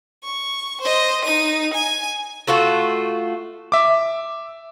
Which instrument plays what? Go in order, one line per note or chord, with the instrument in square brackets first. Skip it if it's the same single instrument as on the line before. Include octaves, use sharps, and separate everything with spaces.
[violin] C#6
C5 D#5
D#4 D#7
G#5
[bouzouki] A3 F4 F#4 A4
[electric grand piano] E5 D6